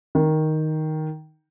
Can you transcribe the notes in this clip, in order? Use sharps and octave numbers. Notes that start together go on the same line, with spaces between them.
D#3